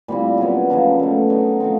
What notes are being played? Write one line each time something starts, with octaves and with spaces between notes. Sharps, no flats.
A#2 G3 C4 E4
C#3 F#3 B3
C#3 F3 A#3 D4
B2 F#3 A3
C#3 F#3 B3 D#4
F3 A3 C4